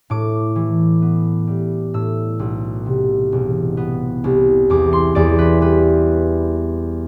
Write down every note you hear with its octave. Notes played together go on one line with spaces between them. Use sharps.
A2 D6
E3
B3
G3
A2 E6
B1
C3
E1
B3
C2
E2 D6
C6
E2 D5
B4
G3 B4